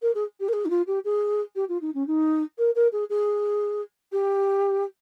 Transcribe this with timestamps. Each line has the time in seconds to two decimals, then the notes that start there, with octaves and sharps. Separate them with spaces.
0.02 A#4
0.15 G#4
0.40 G4
0.48 A#4
0.53 G#4
0.65 D#4
0.70 F4
0.87 G4
1.04 G#4
1.55 G4
1.68 F4
1.81 D#4
1.94 C#4
2.07 D#4
2.58 A#4
2.75 A#4
2.92 G#4
3.10 G#4
4.12 G4